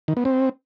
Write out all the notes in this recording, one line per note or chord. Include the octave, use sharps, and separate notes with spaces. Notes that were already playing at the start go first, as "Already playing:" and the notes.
D#3
B3
C4